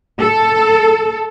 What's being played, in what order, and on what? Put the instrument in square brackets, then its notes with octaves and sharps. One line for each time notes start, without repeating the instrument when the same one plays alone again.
[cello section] A4